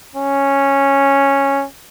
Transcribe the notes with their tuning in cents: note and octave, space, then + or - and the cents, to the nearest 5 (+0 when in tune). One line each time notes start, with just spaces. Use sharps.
C#4 -5